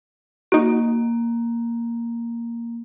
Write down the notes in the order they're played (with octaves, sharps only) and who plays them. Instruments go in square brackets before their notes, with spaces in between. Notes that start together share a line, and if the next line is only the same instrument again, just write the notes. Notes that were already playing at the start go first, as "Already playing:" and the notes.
[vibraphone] A#3 [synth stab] D#4 F#4